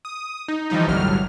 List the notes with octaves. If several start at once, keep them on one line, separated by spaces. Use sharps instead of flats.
D#6
D#4
E3 F3 G3 D#4
G1 C2 A2 F#3 G3 F6